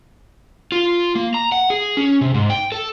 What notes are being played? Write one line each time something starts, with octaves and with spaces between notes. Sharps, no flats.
F4
A#3
A#5
F#5
G#4
C#4
C3
G#2
G5
A4